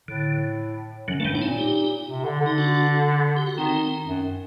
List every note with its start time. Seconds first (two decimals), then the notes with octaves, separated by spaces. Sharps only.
0.08 A2 D3
1.08 F#2 D3 F#3
1.20 G2 D#3 G3 A3
1.33 A2 D4
1.42 C4 D#4
1.46 A#2
1.58 D#4 G4
2.08 C3
2.25 D3
2.41 D3
2.46 D#4
2.58 D4 F#4
3.37 G4
3.47 F#4
3.57 D#3 C4 D#4
4.07 F#2